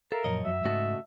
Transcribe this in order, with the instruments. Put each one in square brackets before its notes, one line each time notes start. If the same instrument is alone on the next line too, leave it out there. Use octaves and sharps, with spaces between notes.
[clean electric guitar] A4 [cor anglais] A#4 [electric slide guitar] E5 F5
[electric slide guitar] F#2 A#2 [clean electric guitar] F3 C#5 D#5
[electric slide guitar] F#2 F#3 [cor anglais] E5
[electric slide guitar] G#2 D#5 A5 [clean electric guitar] C#3 A3 F#4